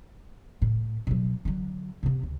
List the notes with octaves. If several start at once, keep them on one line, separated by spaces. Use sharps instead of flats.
A2
B2 F#3
D3 F#3
C3 B3
D2